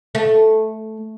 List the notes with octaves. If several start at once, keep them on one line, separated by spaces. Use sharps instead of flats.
A3